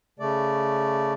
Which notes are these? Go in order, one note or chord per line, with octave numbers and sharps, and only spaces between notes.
C#3 A3 D5